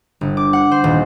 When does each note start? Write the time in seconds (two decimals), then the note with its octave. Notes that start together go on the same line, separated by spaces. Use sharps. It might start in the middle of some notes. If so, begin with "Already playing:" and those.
0.21 G1
0.37 D6
0.53 F#5
0.71 C5
0.84 D#1